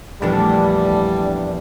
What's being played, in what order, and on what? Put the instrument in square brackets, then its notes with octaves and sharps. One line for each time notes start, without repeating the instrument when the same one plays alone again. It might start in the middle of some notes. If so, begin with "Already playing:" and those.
[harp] A#1 E2 [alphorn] G3 [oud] A3 E4 A4 [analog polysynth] D4